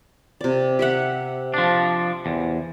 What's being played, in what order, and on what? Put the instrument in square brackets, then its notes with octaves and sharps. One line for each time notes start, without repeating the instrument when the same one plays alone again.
[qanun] C3 D5
G4 E5 F#5
[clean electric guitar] F3 D4
E2